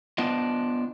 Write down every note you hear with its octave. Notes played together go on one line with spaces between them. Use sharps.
B3 D4 F4 D#5